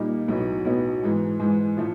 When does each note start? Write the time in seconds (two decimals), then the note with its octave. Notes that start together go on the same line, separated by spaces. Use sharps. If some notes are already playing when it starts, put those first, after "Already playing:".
Already playing: A#2 G3 A#3 D#4
0.28 B1 A2 F#3 B3 D#4
0.65 B1 A2 F#3 B3 D#4
1.02 G#2 E3 G#3
1.39 G#2 E3 G#3
1.77 A2 F3 A3